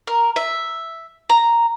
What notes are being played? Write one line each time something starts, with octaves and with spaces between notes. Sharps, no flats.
A#4
E5
A#5